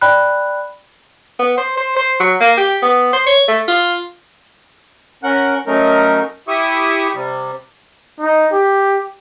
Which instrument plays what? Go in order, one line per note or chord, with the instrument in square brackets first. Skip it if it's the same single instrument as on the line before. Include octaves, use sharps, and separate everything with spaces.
[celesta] D5 G5 B5 F#6
[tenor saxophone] B3
C5
C5
C5
F#3
A#3
G4
B3
C5
C#5
A3
F4
[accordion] C#4 A#4 F#5 F#6
F#3 A3 C#4 D#4 A#4
E4 G4 E5 C#6 D#6
C3 G3
[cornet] D#4
G4